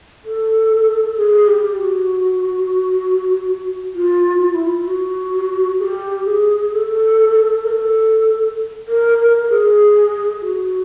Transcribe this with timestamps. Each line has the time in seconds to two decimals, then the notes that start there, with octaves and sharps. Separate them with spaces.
0.25 A4
1.16 G#4
1.47 G4
1.79 F#4
3.94 F4
4.41 F4
4.54 E4
4.66 F4
4.87 F#4
5.79 G#4
5.83 G4
6.26 G#4
6.72 A4
7.64 A#4
7.68 A4
8.88 A#4
9.18 A#4
9.50 G#4
10.41 F#4